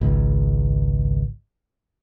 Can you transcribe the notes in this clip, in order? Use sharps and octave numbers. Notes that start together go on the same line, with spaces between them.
G#1 C#2